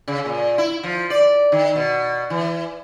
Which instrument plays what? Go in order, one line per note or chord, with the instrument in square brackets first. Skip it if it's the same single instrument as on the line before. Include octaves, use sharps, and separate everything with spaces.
[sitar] C#3
A#2
E4
F3
D5
D#3
B2
E3